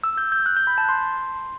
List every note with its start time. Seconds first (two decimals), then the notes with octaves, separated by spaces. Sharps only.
0.04 E6
0.18 G6
0.32 G6
0.46 F#6
0.56 G6
0.67 B5
0.78 A5
0.89 C6